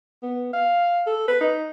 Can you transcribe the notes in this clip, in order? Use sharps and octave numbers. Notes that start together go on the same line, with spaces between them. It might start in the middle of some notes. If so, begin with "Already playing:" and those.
B3
F5
A4
B4
D#4